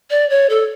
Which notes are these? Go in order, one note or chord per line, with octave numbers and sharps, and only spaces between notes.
D5
C#5
A4